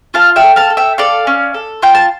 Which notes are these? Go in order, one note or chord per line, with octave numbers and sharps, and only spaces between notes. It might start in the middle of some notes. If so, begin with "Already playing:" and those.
F4 F5 A5
E5 G5
A4
F5 A5
A4
E5 G5
A4 D5 F5
C#4
A4
F4 G5
A5